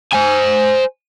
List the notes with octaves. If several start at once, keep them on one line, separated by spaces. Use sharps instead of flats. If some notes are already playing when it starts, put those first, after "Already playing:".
C5 G#5